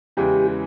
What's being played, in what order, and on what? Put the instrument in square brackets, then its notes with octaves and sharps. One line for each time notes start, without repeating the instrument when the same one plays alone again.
[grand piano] E2 C#3 E3 G#3 [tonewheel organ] G4